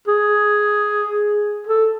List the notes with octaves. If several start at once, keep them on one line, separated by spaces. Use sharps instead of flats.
G#4
A4